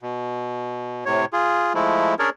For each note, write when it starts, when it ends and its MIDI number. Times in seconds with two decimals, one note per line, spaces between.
0.02 1.04 47
1.06 1.25 45
1.06 1.25 48
1.06 1.25 73
1.33 1.73 65
1.33 1.73 68
1.75 2.14 53
1.75 2.14 56
1.75 2.14 57
1.75 2.14 64
2.19 2.30 61
2.19 2.30 62
2.19 2.30 68
2.19 2.30 70
2.19 2.30 73
2.19 2.30 74